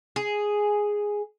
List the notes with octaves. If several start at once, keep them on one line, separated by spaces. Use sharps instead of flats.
G#4